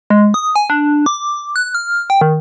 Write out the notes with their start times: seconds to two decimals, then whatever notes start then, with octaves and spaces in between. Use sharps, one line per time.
0.10 G#3
0.34 D#6
0.56 G#5
0.70 D4
1.06 D6
1.56 F#6
1.75 F6
2.10 G5
2.21 D#3